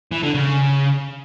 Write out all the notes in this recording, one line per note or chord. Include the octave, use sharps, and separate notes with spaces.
E3
D3
C#3